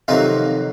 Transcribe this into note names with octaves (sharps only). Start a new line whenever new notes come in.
F2 C3 D#3 F#3 D#4 F4